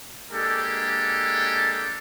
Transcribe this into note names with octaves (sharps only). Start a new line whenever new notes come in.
G#3 A#3 D4 G4 A4